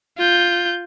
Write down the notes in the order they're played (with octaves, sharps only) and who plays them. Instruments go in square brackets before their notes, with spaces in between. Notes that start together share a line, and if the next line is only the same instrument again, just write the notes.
[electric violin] F4 G6